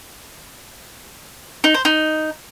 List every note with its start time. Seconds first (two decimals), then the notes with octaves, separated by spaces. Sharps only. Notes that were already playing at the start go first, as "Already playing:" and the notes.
1.64 D#4
1.74 C5
1.85 D#4